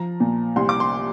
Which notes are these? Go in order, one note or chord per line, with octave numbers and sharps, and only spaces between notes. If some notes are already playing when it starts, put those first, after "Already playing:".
Already playing: F3 A#5
A#2
C2 C6
D6
C6